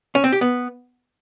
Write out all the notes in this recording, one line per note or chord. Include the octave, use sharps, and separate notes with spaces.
C#4
C4
G4
B3